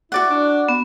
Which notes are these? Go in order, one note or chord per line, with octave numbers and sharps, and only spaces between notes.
E4 F#4 D5 F#5
D4
B3